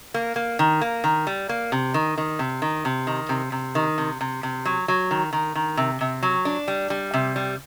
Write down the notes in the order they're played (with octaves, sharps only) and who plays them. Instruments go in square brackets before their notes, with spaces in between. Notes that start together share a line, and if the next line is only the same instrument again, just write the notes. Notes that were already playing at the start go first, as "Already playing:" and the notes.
[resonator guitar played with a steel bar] A#3
A#3
D#3
A#3
D#3
G3
A#3
C3
D#3
D#3
C3
D#3
C3
D#3
C3
C3
D#3
C3
C3
C3
F#3
F#3
D#3
D#3
D#3
C3
C3
F#3
D4
G3
G3
C3
G3